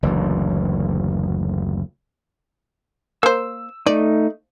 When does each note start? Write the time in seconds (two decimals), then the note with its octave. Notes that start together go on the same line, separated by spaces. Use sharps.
0.03 F#1 D2 E3
3.23 A#3 C5 E6
3.86 A3 D#4 D5